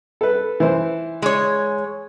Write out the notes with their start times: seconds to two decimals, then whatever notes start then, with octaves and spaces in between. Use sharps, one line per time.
0.21 A4 B4
0.60 E3 C5
1.22 G#3 C#5